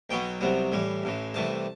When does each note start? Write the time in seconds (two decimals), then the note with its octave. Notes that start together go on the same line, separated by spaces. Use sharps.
0.10 B1 B2 F#3 B3 G5
0.41 C2 C3 F#3 B3
0.72 A2 E3 G3
1.03 A1 A2 E3
1.34 C2 C3 E3 A3 A5